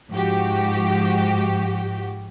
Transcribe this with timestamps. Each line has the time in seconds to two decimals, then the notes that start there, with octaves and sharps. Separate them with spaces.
0.11 G#2 F3 F#4 G4